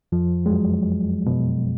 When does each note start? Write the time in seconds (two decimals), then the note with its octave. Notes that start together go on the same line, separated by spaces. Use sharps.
0.12 F2 F3
0.46 G#3
0.50 F#2 F#3
1.27 B2